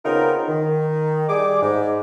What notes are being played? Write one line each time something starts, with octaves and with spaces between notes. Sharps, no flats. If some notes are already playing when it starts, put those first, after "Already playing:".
C#3 B3 C4 D#4 F4 A#4
D#3
G3 G#4 D6
G#2